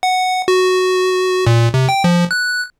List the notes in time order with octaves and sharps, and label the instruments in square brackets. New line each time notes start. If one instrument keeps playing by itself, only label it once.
[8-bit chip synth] F#5
F#4
A#2
C3
G5
F3
F#6